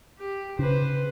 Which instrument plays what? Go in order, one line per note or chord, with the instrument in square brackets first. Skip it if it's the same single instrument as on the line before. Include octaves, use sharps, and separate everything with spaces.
[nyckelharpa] G4
[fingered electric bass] C#3 [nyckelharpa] B4 C5